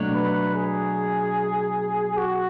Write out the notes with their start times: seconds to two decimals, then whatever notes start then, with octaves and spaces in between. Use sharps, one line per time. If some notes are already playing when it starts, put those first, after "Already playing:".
Already playing: B2 F#3 A3 D4
0.14 B4
0.55 G#4
2.18 F#4